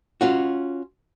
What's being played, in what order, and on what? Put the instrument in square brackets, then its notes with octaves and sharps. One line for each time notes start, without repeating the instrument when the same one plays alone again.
[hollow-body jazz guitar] C#4 F4 F#4